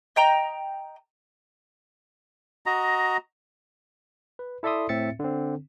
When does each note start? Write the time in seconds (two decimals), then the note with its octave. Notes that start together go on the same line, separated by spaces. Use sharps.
0.16 D#5 G5 A#5
2.66 F#4 D#5 A#5
4.39 B4
4.63 E4 A4 D5 E5 C6 D#6
4.89 A2 C4 E5 A6 C#7
5.19 D3 C4